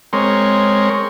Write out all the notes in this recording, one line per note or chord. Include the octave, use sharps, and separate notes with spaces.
G#3 C4 A#4 C#5 C6